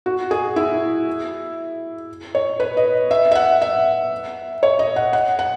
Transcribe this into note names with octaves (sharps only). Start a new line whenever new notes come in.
F#4
G#4
E4
C#5
B4
D#5
E5
E5
F#5
E5
C#5
D#5
F#5
F#5
F#5